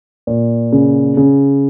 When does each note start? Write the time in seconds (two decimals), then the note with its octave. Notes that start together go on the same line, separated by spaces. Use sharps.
0.27 A#2
0.72 C#3
1.17 C#3